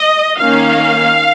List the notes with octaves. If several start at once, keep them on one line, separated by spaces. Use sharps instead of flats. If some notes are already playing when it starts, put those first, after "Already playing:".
Already playing: D#5
D#3 A#3 C#4 F5